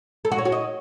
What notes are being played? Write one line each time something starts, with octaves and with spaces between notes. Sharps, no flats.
A4
F#4
C#5
F#4
D#5